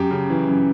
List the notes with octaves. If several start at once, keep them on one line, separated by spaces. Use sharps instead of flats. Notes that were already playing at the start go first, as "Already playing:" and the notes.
Already playing: F#2 G4
C#3
E3
F#2